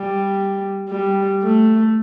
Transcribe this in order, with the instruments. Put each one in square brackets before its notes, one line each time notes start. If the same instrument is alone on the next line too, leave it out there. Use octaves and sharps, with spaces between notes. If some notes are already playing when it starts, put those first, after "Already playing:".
Already playing: [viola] G3
G3
A3